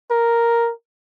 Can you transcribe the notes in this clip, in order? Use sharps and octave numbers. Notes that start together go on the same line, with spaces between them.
A#4